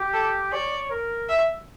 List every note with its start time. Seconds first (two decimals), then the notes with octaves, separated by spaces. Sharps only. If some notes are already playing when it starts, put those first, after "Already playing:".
Already playing: G4
0.14 A4
0.52 C#5 D5
0.90 A#4
1.29 E5